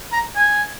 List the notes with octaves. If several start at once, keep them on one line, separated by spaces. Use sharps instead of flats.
A#5
G#5